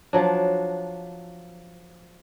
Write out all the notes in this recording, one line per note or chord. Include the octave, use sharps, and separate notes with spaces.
F3 F#3 D4